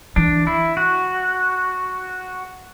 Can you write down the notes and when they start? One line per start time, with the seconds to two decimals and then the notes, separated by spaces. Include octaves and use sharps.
0.16 E3 D4
0.47 E4
0.77 F#4